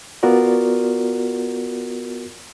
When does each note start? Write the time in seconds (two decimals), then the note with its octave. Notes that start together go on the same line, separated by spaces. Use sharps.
0.23 B3 F4 F#4 A#4 D5